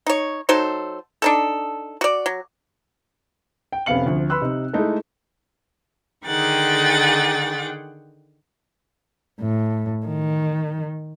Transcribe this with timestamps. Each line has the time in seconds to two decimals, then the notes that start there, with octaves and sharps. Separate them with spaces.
0.06 D#4 C#5
0.49 F#3 D#4 A4 C5
1.22 D4 D#4 A4
2.01 F#4 D5
2.26 F#3
3.73 G5
3.86 F1 B3 C#4 F5 C#7 F#7
4.06 D2 F3
4.30 B4 B5 C6 E6 F#6
4.41 C3 D#4
4.73 G#3 A3 D#4 E4 A4
6.26 D3 D#3 G#4 F#5 G5 A6
9.41 A2
10.07 D#3